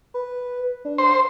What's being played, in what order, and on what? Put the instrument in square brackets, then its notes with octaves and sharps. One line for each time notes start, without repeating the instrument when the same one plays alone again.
[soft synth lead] B4
D4
[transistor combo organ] C5